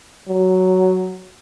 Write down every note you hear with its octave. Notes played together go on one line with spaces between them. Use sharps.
F#3